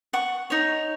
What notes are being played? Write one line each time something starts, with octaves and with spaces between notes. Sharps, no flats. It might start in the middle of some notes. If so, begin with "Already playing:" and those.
F#5 C#6
D#4 C#5